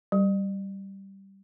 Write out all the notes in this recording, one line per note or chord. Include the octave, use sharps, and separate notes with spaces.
G3